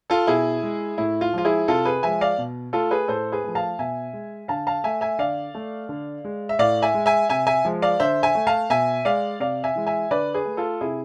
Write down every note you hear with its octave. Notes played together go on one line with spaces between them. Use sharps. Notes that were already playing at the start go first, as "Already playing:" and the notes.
F4 A4
B2 E4 G#4
G#3
A2 E4
F4
F3 G#3 F4
E4 G#4
C3 F4 A4
G#4 B4
F3 G#3 E5 G#5
D5 F5
B2
A3 F4 A4
G#4 B4
A2 A4 C5
G#4 B4
F3 A3
F5 A5
B2 E5 G#5
G#3
D3 F5 A5
F5 A5
A3 E5 G#5
E5 G#5
D3 D5 F5
A3
D3
G#3
E5
A2 D5 F5
E5 G#5
G#3
E5 G#5
C3 E5 G#5
E5 G#5
F3 G#3
D5 F5
D3 C5 E5
E5 G#5
A3
F5 A5
B2 E5 G#5
G#3 D5 F5
C3 D5 F5
E5 G#5
E3 G#3
E5 G#5
D3 B4 D5
G#4 B4
A3
F4 A4
C3 E4 G#4